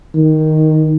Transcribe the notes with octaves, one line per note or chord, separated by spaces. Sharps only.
D#3